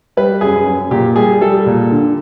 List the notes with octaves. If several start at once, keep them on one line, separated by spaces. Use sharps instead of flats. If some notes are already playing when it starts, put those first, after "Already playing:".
G3 B4
F#2 G#4
F#2
A#2 G4
G3 G#4
G3 A4
A#2
D3